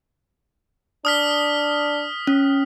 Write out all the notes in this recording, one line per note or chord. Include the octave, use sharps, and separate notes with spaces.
D4 D#6 F6 B6
C#4